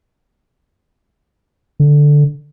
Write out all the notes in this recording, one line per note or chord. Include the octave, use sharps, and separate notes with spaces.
D3